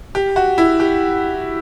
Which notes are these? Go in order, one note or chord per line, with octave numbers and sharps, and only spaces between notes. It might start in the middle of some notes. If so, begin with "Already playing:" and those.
G4
F#4
E4
G4